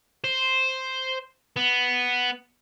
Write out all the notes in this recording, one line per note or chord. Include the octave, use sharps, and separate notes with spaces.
C5
B3